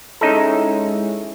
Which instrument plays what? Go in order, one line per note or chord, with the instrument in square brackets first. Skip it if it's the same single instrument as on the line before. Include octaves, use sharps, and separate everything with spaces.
[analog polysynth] G#3 C#4 E4 [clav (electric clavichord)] D#4 A4